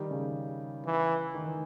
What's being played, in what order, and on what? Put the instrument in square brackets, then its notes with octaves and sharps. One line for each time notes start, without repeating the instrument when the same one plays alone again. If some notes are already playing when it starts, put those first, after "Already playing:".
Already playing: [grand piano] D#3 G3
C#3
[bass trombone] E3
[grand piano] D#3
E3